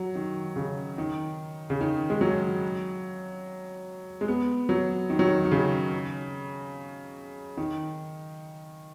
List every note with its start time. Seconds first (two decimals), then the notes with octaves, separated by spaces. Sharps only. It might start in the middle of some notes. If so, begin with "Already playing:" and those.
Already playing: F#3
0.15 D#3
0.56 C#3
0.98 D#3
1.70 C#3
1.81 D#3
2.10 G#3
2.21 F#3
4.21 G#3
4.28 B3
4.69 F#3
5.10 D#3
5.19 F#3
5.27 D#3
5.45 D#3
5.51 C#3
7.57 D#3